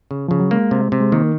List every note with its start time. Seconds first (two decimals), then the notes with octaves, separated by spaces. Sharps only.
0.11 C#3
0.28 C#3 F3
0.40 F#3
0.51 G#3 A#3
0.71 C3
0.92 C3
1.00 G#3
1.12 D#3 A#3